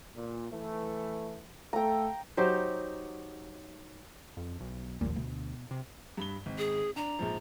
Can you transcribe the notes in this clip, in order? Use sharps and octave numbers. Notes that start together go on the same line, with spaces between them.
A#2
E3 A3
A3 A4 G5 A#5
F#3 D#4 G4 C5
F2
B1
A#1 D#2 A#2
D2 B2
C3
G2 B5 G7
G#1
G#4
D4 A#5
A#1 G#2 F3